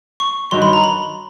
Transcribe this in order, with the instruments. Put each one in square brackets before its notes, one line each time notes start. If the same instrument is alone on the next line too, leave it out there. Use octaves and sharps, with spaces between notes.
[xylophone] C#6
[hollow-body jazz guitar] G2 D#3 F#3 [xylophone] C6
[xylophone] B5
A#5
B5